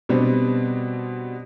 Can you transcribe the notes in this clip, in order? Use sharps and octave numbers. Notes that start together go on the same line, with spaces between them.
B2 G3 B3 C4 D4